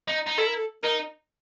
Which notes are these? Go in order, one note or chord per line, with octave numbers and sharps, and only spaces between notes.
D#4
D#4
E4 A4
A#4
A4
D#4 A#4